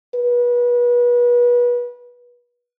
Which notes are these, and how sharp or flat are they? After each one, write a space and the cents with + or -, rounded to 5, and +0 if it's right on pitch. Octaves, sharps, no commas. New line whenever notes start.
B4 -30